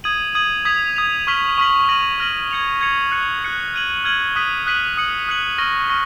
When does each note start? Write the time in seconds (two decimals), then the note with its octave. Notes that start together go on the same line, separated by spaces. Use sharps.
0.04 D#6 G#6 D#7 F#7
0.35 D#6 G#6 D#7 F#7
0.65 D#6 G#6 B6 F7
0.96 D#6 G#6 B6 F7
1.27 C#6 F6 B6 F#7
1.58 C#6 F6 B6 F#7
1.88 F6 A#6 D#7 F#7
2.20 F6 A#6 D#7 F#7
2.51 G#6 C#7 F7
2.81 G#6 C#7 F7
3.12 F#6 C#7 F7
3.43 F#6 C#7 F7
3.74 F6 G#6 D#7 F#7
4.04 F6 G#6 D#7 F#7
4.36 D#6 F#6 B6 D#7 F#7
4.66 D#6 F#6 B6 D#7 F#7
4.97 D#6 F#6 C#7 F#7
5.28 D#6 F#6 C#7 F#7
5.58 C#6 F6 A#6
5.89 C#6 F6 A#6